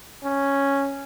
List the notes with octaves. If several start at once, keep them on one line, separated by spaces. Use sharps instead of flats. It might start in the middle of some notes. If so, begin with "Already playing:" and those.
C#4